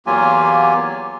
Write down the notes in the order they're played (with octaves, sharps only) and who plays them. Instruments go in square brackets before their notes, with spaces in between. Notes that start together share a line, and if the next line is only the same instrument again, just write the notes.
[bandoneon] E2 F#3 A#3 F4 G4 G#5